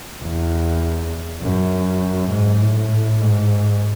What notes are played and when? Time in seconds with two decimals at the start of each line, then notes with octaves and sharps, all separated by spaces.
0.22 E2
1.42 F#2
2.31 G#2
2.61 A2
3.21 G#2